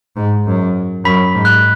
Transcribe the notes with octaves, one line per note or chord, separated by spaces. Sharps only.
G#2
F#2
F#2 B5 B6
G#2
F#6